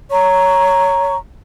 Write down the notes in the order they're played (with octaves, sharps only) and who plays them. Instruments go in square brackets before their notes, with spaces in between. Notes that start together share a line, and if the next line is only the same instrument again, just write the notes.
[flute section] C#5 A#5 C#6